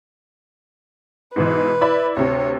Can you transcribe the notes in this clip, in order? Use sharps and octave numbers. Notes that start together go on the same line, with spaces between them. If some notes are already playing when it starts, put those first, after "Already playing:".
G#2 B2 E3 B4
E4 D5 B5
D2 C3 C#5